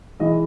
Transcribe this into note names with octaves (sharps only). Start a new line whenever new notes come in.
E3 G#3 D#5